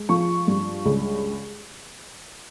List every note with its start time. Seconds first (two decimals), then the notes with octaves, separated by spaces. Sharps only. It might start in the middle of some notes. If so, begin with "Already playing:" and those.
Already playing: G#3
0.09 F3 C#6
0.48 G2
0.85 C#2